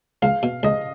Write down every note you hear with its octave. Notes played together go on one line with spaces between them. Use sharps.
C#2 F5
B2
C#2 D#5